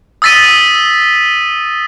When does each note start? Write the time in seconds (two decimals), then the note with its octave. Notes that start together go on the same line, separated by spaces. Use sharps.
0.22 D#6 E6 A6 B6 D#7